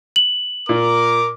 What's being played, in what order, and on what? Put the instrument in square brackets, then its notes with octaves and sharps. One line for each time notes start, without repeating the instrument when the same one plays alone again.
[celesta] F#7
[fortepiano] A#2 [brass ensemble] A#4 [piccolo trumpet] D6